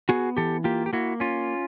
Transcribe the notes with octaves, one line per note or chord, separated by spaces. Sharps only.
B3 F#4 G#4
E3 G4 A4
A#3 F4 G4
G4
A#3 E4 F#4
C#4 F4